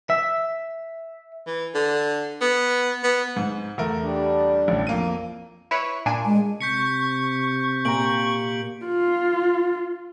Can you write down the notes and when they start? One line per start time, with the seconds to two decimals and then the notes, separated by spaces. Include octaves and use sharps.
0.10 E5
1.47 E3
1.75 D3
2.41 B3
3.04 B3
3.36 G#2
3.78 E2 A3 A#4
4.03 G3 D4
4.68 A1
4.87 F2 A#3 D#7
5.71 E4 B4 C#5
6.06 A#2 D4 G#5
6.25 G#3
6.61 C3 C#6 G6 B6 C#7
7.85 A#2 G4 A#5 D7 F#7
8.85 F4